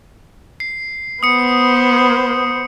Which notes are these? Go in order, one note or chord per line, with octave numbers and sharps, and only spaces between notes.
C7
B3 C5 D#6 C#7